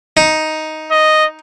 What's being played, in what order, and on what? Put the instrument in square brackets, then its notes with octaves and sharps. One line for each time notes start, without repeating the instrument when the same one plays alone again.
[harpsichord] D#4
[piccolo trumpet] D#5